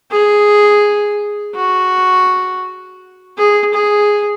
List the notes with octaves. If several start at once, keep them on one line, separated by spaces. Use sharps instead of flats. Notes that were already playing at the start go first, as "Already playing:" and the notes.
G#4
F#4
G#4
G#4